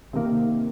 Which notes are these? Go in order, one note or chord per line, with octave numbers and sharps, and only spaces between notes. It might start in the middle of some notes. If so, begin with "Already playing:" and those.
C3 D#3 A#3